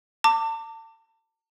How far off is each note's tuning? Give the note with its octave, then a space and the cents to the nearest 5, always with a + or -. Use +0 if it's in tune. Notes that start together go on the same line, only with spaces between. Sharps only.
A5 +40 D6 +0